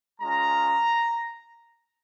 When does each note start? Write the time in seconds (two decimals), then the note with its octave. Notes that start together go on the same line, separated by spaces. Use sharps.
0.20 G#3 C#4 F4 A#5